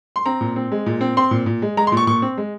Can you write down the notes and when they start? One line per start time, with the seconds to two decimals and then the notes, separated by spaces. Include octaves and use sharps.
0.16 C6
0.26 C4 A#5
0.41 A#2
0.56 C4
0.72 G#3
0.86 A#2
1.01 C4
1.17 C4 C6
1.31 A#2
1.46 A#2
1.62 G#3
1.77 G#3 A#5
1.87 C6
1.92 A#2
1.97 C#6
2.07 A#2 C#6
2.22 C4
2.38 G#3